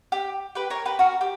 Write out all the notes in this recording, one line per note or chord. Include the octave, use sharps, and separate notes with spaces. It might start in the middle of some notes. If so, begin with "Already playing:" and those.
G4
G4 B4
A#4 C#5
G4 B4
F#4 A#4
G4